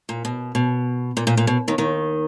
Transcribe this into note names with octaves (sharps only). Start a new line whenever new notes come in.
A#2
B2
B2
A#2
A#2
A#2
B2
D#2 D#3
D#2 D#3